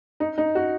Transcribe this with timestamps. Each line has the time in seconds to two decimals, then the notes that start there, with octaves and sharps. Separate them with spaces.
0.20 D#4
0.38 D#4
0.55 F#4